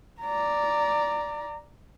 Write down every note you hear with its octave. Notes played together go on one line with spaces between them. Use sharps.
D5 A#5